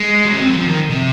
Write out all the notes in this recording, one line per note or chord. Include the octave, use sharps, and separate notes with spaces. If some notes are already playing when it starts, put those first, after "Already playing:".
Already playing: G#3
F#3
C#4
C4
F#3
F3
D#3
C3